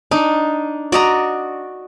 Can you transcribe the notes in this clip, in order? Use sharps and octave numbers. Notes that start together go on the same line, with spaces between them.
D4 D#4
F#4 D5 D#5 A#5